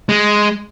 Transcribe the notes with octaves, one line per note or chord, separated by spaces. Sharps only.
G#3